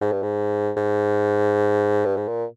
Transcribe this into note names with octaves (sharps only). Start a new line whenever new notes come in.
G#2
G2
G#2
G#2
G2
G#2
A#2